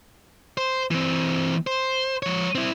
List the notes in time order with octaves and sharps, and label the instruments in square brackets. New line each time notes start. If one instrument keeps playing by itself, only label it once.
[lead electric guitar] C5
E3 C4
C5
F3 C#5
C4 E4